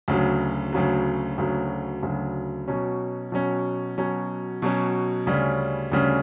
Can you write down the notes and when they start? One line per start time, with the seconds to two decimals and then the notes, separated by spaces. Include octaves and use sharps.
0.08 D2 C#3 F#3
0.73 D2 C#3 F#3
1.38 D2 C#3 F#3
2.03 D2 C#3 F#3
2.68 B2 F#3 C#4
3.32 B2 F#3 C#4
3.98 B2 F#3 C#4
4.62 B2 F#3 C#4
5.26 D2 C#3 G3 C#4
5.92 D2 C#3 G3 C#4